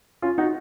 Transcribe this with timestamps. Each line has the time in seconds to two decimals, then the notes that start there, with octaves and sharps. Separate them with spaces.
0.22 C#4 F4
0.38 D#4 F#4